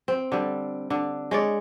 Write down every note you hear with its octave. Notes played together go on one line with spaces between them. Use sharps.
C4
D3 G3
D3
G#3 C#5 D5